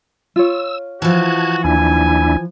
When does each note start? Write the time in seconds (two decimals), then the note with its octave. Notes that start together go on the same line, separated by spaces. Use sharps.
0.36 F4 C#5 E6
1.02 E3 F3 F#4 A5 F#6 G#6
1.64 D#2 D4 E4 G#5